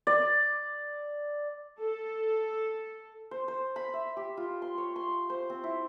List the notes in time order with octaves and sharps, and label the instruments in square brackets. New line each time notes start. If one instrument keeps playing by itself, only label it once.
[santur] D5
[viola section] A4
[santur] C5
C5
B5
E5
G4
F4
C6
C#5
C6
C5
C4
E4